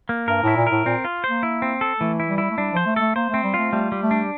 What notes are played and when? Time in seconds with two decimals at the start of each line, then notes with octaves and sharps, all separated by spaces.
0.09 A#3
0.28 G2 A#4
0.43 A2 E4
0.56 A#2
0.67 A#4
0.72 A2
0.85 A#2 C4
1.04 F4
1.24 A#3 C5
1.43 E4
1.62 C4
1.81 A4
2.00 E3 A3
2.20 E4
2.29 G3
2.38 E4
2.51 A3
2.58 G3 D4
2.73 F3 C5
2.86 A3
2.96 A3 A4
3.15 A#3 C5
3.29 A3 C4
3.43 G3
3.54 A3 F4
3.72 G3 A3
3.92 G3
4.02 A3
4.11 D4